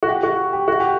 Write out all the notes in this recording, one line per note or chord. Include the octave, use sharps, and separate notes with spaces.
F#4
G4
F#4
G4
F#4
G4